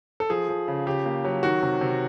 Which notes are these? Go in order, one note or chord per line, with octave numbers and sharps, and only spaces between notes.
A4
F3 G#4
F3
C#3
C#3 G4
A#3
F#3
D#3 F#4
C3
C3